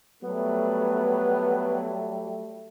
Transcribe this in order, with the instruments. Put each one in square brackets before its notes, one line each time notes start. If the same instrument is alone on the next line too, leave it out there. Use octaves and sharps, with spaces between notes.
[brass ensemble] F#3 G3 A3 [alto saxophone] B3